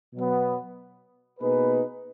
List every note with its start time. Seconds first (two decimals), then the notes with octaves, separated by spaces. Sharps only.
0.14 B2 F#3 B3
1.39 B2 A#3 D#4 G#4 B4